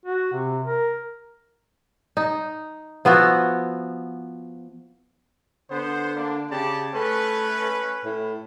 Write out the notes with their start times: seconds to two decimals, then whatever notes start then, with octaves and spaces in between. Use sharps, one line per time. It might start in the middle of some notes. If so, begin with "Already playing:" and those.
0.05 F#4
0.33 C3
0.64 A#4
2.17 D#4
3.05 F3 B3 E4 F#4
5.71 D3 B3 C5
6.16 A#3 D4
6.51 C#3 G4 D5 A5
6.94 A3 C#4 B4
8.05 A2